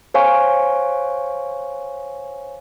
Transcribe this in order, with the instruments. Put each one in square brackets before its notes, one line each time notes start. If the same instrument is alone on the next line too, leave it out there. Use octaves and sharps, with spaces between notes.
[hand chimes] C5 C#5 F5 G#5 C#6